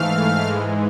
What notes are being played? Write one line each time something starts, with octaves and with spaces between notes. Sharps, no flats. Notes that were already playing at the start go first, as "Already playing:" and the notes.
Already playing: G#2 E3 A3 F5 F6
G#2 E3 G#3